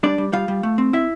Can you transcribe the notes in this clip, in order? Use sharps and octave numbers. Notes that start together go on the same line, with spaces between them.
G3 D4 D5
G3
G3 F4 F5
G3
A3
C4
E4 E5